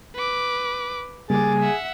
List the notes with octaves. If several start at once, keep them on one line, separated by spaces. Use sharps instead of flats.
B4 D6
C#3 G3 A#3 G#4 D6 A6
E5 F#5